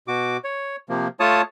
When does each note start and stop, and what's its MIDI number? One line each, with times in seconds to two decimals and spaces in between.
0.08 0.37 47
0.08 0.37 66
0.08 0.37 86
0.44 0.76 73
0.89 1.08 48
0.89 1.08 53
0.89 1.08 58
1.20 1.42 57
1.20 1.42 65
1.20 1.42 73
1.20 1.42 81
1.20 1.42 87